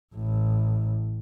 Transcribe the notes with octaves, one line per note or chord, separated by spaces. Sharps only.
A1 A2